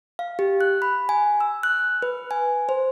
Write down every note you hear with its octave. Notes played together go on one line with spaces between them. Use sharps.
F5
G4
F#6
B5
G#5
E6
F#6
B4
G#5
C5